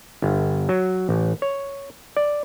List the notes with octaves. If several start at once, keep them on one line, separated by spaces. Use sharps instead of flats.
G1
F#3
A1
C#5
D5